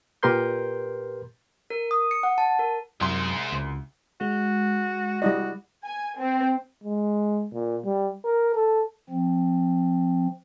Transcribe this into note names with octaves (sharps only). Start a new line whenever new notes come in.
A#2 G4 A#4 B4 C6 G6
A#4
D#6
C#7
F#5
A5
A#4
C2 F#2 G#3 C5 C6
C#2
G#3 F#4
G3 E4 F#4 D5 D#5
G#5
C4
G#3
A#2
G3
A#4
A4
F3 C4